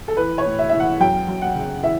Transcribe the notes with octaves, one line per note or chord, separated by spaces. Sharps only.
A4
E3 B4
C#5
A2
E5
E3 E5
F#5
F#2 G5
F#2
F#5
C#3
E3 E5